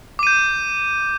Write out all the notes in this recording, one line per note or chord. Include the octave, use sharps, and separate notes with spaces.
D6 G6 D#7